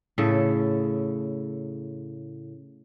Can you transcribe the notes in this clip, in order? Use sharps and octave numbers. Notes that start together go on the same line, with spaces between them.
A2 C#3 A4